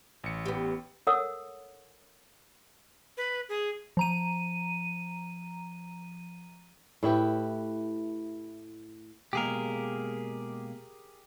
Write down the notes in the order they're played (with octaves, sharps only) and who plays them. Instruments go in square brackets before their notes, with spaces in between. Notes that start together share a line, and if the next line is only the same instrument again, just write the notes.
[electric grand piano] A1 C#7
[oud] B3 G4
[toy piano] A4 A#4 C#5 F#5 D#6 E6
[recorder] B4
G#4
[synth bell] F3 A#5 D#7
[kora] A2 E4 G4 B4
[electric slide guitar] B2 G#3 A#3 [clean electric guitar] G4 G#4 A#4